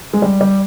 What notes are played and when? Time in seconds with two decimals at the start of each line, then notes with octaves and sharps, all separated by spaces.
0.13 G#3
0.22 G3
0.41 G3